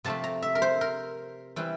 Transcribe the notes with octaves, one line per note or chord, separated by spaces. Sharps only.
C3 F3 A3 C4 A5
A#5
E5
A#4
C5
A#4
E3 G3 C4